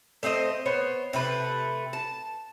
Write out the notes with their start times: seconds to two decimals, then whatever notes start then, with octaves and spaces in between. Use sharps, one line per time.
0.23 A3 C4 C5 D#5
0.66 B3 C5 C#5
1.13 C3 A3 B4
1.93 A5